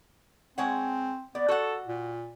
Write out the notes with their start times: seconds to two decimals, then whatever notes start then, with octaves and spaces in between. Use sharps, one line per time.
0.58 G#3 C4 C#5 F#5
1.35 B3 D5
1.48 F#4 A4 F#5
1.87 A#2